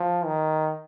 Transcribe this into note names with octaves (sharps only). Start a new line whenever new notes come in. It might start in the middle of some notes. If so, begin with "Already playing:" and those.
Already playing: F3
D#3